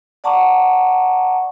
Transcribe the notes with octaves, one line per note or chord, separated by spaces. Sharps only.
D5 F#5 A5 A#5 C#6 D6